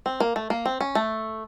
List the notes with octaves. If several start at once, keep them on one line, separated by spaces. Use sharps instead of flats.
C4
A#3
A3
A#3
C4
C#4
A3